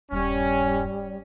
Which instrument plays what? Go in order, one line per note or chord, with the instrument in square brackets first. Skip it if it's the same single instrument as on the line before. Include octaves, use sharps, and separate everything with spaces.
[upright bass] D#1 G2 [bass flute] G3 [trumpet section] C#4